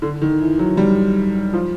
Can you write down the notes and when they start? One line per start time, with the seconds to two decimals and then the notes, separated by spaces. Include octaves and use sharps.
0.02 D3
0.21 D#3
0.41 E3
0.59 F#3
0.77 G3
1.53 F3